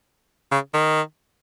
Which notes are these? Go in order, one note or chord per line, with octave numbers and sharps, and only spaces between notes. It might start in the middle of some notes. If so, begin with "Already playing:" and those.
C#3
D#3